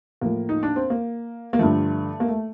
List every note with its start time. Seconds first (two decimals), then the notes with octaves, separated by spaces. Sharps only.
0.21 A2 F3 A#3
0.49 D#4
0.63 D4
0.76 C4
0.90 A#3
1.53 A#3
1.59 G2 D3 F3 A3
2.20 A#3
2.28 A3